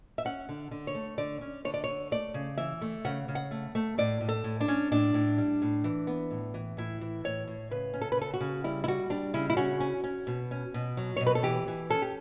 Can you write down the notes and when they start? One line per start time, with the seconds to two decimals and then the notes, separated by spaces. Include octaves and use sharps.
0.18 E5
0.25 C#4 F#5
0.49 D3
0.71 D3
0.87 C#5
0.95 A3
1.18 D3 D5
1.41 C#4
1.65 D3 C#5
1.74 D5
1.84 D3 C#5
2.11 A3 D5
2.34 C#3
2.58 E3 E5
2.81 A3
3.05 C#3 F#5
3.28 C#3
3.35 F#5
3.51 A3
3.75 A3
3.98 A2 D5
4.21 A2
4.29 A4
4.44 A2
4.61 D4
4.68 C#4
4.91 A2 D4
5.14 A2
5.38 G3
5.62 A2
5.84 E3
6.07 B3
6.31 A2
6.54 E3
6.77 A2 E4
7.01 E3
7.24 A2 C#5
7.47 A2
7.71 C#3 B4
7.94 C#4
8.01 A4
8.12 B4
8.17 C#3 A4
8.34 F#4
8.41 C#3
8.64 G3 E4
8.84 E4
8.88 G3 F#4
9.10 G3 D4
9.34 C#3 E4
9.50 E4
9.57 C#4 F#4
9.80 C#4
10.04 C#4
10.27 B2
10.51 C#4
10.74 B2
10.97 F#3
11.17 C#5
11.21 B2
11.27 B4
11.35 A4
11.43 E3 G4
11.67 E3
11.90 C#4 A4
12.02 G4